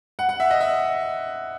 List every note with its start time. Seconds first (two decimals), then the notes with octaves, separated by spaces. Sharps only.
0.19 F#5
0.29 F#5
0.40 E5
0.50 D#5
0.60 E5